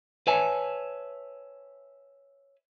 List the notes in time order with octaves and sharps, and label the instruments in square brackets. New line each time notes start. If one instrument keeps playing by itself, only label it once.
[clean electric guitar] B4 C#5 E5 G#5 A5